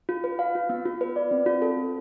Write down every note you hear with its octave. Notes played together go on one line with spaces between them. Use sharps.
F4
B4
F5
F4
B3
F4
B4
D5
C4
F4
A4
C4